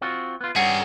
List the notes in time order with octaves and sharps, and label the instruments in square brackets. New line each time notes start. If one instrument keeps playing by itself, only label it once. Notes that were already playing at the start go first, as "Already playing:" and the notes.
[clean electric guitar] C4 F4 F#4
B3 F4
[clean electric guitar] G2 G3 C#4 [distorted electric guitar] G#4 A#4 [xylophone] F#5